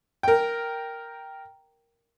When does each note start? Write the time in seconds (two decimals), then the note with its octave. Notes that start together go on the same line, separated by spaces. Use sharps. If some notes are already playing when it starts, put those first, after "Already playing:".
0.23 A#4 G5